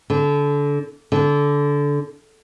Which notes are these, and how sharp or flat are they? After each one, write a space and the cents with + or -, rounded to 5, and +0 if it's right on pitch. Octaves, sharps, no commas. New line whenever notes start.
D3 -25
D3 -20